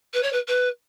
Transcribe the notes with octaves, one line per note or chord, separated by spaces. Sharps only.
B4
C#5
B4
B4